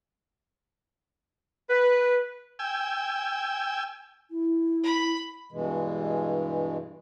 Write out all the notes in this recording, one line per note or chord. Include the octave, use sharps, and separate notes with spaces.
B4
G5 G#5 E6
E4
B5
G2 B2 E3 G#3